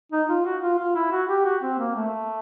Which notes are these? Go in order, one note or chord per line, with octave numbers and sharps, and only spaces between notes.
D#4
F4
F#4
F4
F4
E4
F#4
G4
F#4
C4
A#3
A3